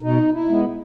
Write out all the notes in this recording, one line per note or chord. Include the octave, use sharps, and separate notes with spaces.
B2 D#4
E4
G#3 B3